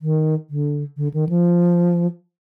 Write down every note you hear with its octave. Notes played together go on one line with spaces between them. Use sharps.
D#3
D3
D3
D#3
F3